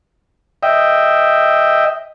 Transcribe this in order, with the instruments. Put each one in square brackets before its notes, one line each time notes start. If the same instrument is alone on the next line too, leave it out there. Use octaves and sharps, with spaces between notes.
[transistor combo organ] D#5 E5 G5